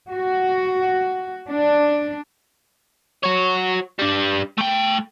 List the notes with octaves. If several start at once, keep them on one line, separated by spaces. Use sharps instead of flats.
F#4
D4
F#4 C#5
G3 D4
A3 G5